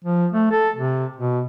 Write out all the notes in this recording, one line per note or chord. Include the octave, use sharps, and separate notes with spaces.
F3
A3
A4
C3
B2